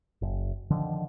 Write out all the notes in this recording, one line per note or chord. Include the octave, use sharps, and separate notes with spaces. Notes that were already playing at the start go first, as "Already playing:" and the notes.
F#1
D3 D#3 F3